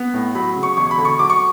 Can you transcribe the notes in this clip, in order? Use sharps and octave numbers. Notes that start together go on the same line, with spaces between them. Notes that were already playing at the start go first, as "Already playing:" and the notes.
Already playing: B3
A2
F#3 B5
C#3
C#6
E1 C#6
B5
D3
C#6
F#3 D6
C#6